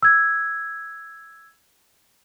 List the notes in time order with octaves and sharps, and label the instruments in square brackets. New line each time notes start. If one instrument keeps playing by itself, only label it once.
[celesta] E6 G#6